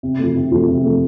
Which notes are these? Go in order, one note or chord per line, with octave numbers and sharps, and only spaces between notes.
C3
F3 A3
C3
F3 A3
C3
F3 A3